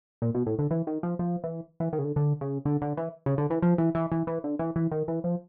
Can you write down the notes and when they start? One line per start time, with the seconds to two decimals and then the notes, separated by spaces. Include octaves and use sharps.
0.22 A#2
0.34 B2
0.47 A2
0.59 D3
0.71 E3
0.87 D#3
1.03 F3
1.19 F3
1.44 E3
1.80 E3
1.93 D#3
1.99 C#3
2.04 D3
2.16 D3
2.41 C#3
2.65 D3
2.82 D3
2.97 E3
3.26 C#3
3.38 D3
3.50 E3
3.62 F3
3.78 E3
3.95 E3
4.12 E3
4.27 E3
4.44 D3
4.59 E3
4.76 E3
4.92 D#3
5.08 E3
5.24 F3